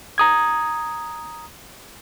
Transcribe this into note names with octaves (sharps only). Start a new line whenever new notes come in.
A#5 D#6 G#6